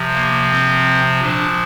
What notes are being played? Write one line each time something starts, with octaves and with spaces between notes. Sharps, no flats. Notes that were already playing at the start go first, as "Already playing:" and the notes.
Already playing: C3 F3
A#3
C4
A#2 F3 D4